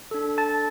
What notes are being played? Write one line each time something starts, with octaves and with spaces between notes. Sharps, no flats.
D4 A4
A5 A6